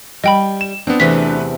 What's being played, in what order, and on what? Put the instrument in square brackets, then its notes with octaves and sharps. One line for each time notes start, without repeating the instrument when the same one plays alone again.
[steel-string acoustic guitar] G3 [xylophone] D#5 G5 B5
[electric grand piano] E7
[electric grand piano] B3 C4 [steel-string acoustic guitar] D4
[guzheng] E2 C3 [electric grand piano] A3 B3 B4 [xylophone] B6